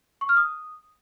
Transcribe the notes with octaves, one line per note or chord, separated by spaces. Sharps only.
C#6
F6
D#6